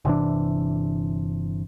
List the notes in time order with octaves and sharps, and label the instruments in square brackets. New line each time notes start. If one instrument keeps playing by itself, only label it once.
[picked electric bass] G1 C3 E3 D4